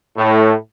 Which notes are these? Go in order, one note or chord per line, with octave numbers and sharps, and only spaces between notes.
A2